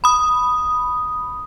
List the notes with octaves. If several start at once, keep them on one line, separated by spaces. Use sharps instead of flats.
B5 D#6